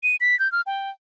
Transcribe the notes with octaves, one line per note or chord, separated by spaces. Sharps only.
D#7
B6
G6
F6
G5